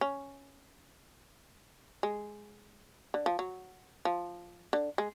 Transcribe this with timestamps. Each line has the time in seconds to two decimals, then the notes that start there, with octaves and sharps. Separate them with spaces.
0.01 C#4
2.03 G#3
3.14 D3
3.26 F3
3.39 F#3
4.05 F3
4.73 D3
4.98 G#3